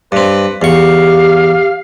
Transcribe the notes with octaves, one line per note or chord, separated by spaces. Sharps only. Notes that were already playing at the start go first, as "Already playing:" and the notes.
G2 C4 B4
E2 G4 F5 C#6